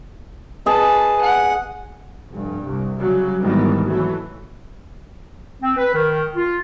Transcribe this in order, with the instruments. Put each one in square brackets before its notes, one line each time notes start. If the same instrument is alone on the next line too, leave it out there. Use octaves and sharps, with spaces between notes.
[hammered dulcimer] G#4 D#5 [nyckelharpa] B4 A5
[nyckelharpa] F#5
[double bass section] F1 G2
C2
C#3 F#3 G3
G#1 G#2 D#3 E3 G3 B3
E3 F#3 A3
[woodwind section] C4
B4
D#3
F4